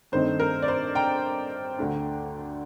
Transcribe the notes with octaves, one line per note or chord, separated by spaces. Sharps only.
G2 D#3 A3 C4 D#4 C5
A#4
D5
C5
G5 A#5
D2 D3 A3 D4